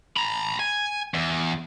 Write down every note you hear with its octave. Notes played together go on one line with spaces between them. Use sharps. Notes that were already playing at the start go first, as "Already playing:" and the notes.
A#5 B5
G#5
E2